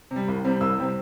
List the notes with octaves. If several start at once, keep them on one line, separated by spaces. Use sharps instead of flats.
C3
G3
C2
C3 G3 C4
C2 E6
C3 G3 C4